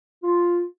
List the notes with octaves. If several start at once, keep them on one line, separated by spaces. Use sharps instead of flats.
F4